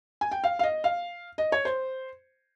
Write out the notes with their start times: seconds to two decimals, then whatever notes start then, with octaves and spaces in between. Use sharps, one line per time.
0.21 G#5
0.31 G5
0.44 F5
0.59 F5
0.63 D#5
0.84 F5
1.38 D#5
1.52 C#5
1.65 C5